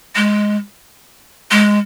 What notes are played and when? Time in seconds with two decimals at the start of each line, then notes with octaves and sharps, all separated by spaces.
0.16 G#3
1.51 G#3